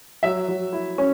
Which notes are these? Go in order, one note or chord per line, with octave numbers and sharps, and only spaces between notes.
F#3 E5
F#3
E4
C#4